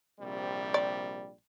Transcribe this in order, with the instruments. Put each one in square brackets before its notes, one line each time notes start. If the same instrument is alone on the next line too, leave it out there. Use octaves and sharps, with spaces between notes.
[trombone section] A#1 C3 G3
[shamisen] D5